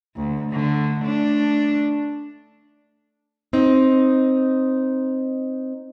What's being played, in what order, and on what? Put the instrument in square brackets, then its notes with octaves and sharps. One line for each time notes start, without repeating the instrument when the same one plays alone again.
[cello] D2
D3 A3
A3 D4
[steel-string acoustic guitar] C4 D#4